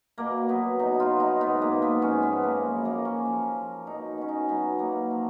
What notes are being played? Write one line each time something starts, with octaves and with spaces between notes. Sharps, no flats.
B2 A#3
F#3 B3
B2 D#4
F4
B2
D#4
G#2 B3
A#3
F3
B3
G#2 C#4
B3
F3
A#3
F#2
A#3
F3
C#4
F3
F3
B2 D#4
B2 C#4
D#4
F#3 B3
F#3 A#3
F3